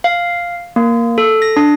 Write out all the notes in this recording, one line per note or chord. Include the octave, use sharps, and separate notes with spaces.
F5
A#3
A4
A#6
D4